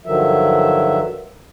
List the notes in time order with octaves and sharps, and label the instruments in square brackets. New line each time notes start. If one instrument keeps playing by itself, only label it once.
[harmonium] G2 D3 D#3 F3 F#3 E5